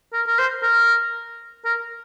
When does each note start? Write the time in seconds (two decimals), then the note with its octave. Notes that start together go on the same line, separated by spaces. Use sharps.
0.13 A#4
0.27 A#4
0.39 C5
0.63 A#4
1.65 A#4